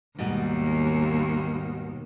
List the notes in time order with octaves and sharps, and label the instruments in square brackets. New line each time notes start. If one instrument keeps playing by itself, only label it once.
[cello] D#2 [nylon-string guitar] G#2 B2 G3